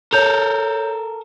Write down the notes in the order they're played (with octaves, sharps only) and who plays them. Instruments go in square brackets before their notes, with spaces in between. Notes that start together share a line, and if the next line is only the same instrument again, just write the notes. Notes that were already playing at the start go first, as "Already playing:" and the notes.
[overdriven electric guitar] A4 A#4 [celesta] C#5 G6 F7